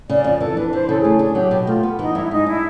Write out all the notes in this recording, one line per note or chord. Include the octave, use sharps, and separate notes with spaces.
C#3 D5
F2 D5
E3 A4
D4 B4
B4
E3 C5
C#3 A4
G#4
A3
D4 G#4
F#3 G4
B2 G4
A3 F4
B3
E3 D#4
G2 E4
G#3 D#4
D4 E4